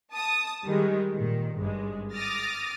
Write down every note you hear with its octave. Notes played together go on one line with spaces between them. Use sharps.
A5 D#6
D#3 G3 G#3
A#2 D#3
G#1 G2 G#3
D6 D#6 F6 A6 A#6